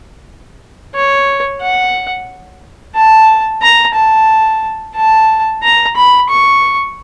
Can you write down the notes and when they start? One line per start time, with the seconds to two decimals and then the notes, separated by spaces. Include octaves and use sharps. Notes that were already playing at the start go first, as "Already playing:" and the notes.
0.95 C#5
1.62 F#5
2.95 A5
3.62 A#5
3.95 A5
4.96 A5
5.63 A#5
5.96 B5
6.30 C#6